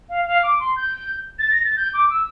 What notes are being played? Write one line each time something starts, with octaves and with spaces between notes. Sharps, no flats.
F5
F5
D6
C6
G6
A6
A#6
A6
G6
D6
E6